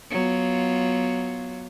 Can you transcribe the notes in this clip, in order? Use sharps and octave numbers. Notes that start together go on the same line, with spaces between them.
F#3 B3 F4